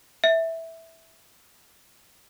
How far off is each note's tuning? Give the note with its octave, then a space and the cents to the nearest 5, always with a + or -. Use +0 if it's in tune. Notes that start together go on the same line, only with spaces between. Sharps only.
E5 -10